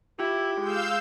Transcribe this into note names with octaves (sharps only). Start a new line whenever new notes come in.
E4 F4 G4
G#3 F5 E6 G6